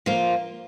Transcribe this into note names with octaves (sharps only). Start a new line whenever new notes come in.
F3 A#3 F4